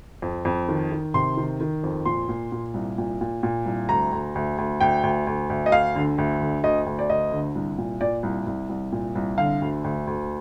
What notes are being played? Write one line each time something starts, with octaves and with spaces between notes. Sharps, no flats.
F2
F2
D#3
D#3
C3 C6
D#3
D#3
F2
A#2 C6
A#2
A#2
C2
A#2
A#2
A#2
C2
D2 A#5
D2
D2
D2
D2 G5
D2
D2
D2
D#5
D2 F5
D3
D2
D3
D2 D#5
D2
D5
D2 D#5
D3
C2
A#2
A#2 D5
C2
C2
C2
A#2
C2
D3 F5
D2
D2
D2